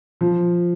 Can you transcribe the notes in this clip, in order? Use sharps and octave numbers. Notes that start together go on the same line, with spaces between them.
F3